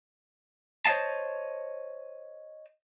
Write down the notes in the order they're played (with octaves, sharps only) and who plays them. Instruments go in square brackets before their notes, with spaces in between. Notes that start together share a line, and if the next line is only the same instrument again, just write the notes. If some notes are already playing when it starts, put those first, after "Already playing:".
[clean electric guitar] C5 C#5 D#5 F5 A5